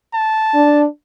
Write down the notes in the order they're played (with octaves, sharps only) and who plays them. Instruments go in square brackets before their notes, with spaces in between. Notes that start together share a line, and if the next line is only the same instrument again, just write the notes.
[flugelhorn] A5
[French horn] D4